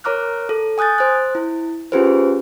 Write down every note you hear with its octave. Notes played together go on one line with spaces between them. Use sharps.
A#4 C#5 A#5 D6 F6 F#6
A4
G#5 D#6 F#6 G6 A6
C5 F#6
E4
C#4 F4 G4 G#4 B4 C5